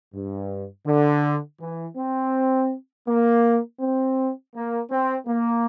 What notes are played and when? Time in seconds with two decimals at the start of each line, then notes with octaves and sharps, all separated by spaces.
0.14 G2
0.87 D3
1.61 E3
1.97 C4
3.07 A#3
3.80 C4
4.54 A#3
4.91 C4
5.27 A#3